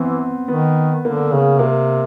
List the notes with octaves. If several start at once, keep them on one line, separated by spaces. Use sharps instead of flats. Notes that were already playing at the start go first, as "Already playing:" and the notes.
Already playing: E3 B3 C4
D#3 B3
D3 A#3
C#3
C3 A#3